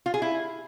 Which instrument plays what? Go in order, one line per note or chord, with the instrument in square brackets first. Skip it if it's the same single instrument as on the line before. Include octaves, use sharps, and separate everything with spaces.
[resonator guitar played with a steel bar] F4
G#4
E4